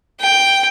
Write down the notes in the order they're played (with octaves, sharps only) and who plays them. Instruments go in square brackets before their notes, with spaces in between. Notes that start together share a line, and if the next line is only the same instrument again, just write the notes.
[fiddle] G5